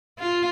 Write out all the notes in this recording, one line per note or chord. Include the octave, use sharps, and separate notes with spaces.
F4